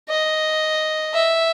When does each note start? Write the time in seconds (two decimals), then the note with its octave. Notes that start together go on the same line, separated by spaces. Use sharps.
0.09 D#5
1.14 E5